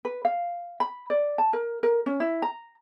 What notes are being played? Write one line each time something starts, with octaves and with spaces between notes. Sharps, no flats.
B4
F5
B5
D5
A5
A#4
A#4
C#4
E4
A#5